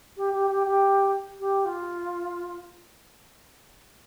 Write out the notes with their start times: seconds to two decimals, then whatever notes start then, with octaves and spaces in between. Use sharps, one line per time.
0.17 G4
0.33 G4
0.50 G4
0.66 G4
1.40 G4
1.65 F4